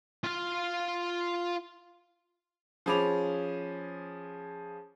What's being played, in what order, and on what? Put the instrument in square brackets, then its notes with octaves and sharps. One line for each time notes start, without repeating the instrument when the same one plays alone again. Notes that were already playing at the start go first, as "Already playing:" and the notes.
[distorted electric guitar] F4 F5
[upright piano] F3 C#4 G#4 B5 D6 F7